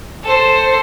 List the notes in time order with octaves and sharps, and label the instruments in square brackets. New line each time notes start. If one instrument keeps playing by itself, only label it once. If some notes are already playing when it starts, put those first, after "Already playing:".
[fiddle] A4 C5